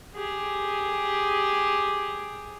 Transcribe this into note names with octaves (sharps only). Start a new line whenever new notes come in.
G4 G#4